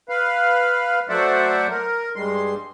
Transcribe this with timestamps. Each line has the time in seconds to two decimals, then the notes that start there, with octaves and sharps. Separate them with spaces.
0.09 B4 F5
1.09 F#3 A3 C5 D5 E5 F#5
1.70 A#4
2.16 G2 G3 G#3 C6